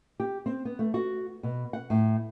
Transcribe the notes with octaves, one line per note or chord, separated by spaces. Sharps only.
G4
C4
B3
A3
F#4
B2
F#5
A2